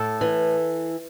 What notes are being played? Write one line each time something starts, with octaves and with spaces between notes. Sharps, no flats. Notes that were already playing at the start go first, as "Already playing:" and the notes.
Already playing: A2 A4
E3